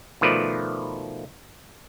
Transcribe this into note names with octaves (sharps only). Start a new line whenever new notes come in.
B2 D#3 F3 A3 B4 D5